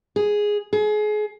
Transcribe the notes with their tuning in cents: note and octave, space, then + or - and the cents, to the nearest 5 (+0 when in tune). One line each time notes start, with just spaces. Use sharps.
G#4 +0
G#4 +30